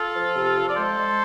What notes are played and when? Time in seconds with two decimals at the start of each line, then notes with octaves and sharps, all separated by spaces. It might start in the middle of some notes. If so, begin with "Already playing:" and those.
Already playing: F4 A4
0.14 F3
0.35 C3
0.55 F3
0.68 D5
0.76 G#3 A4 C5
0.97 G#3